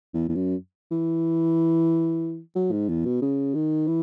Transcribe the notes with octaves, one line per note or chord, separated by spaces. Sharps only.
E2
E2
F#2
E3
F#3
G#2
E2
B2
C#3
D#3
E3